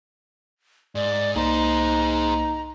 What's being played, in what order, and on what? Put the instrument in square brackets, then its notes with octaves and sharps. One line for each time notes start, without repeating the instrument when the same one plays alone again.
[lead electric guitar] G#2 [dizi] D5
[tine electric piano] C2 A#3 [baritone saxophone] D#4 [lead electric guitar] G#4 C5 [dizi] A#5